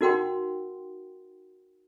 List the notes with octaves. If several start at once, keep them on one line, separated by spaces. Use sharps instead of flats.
D#4 F#4 A#4 F#5 G5 C6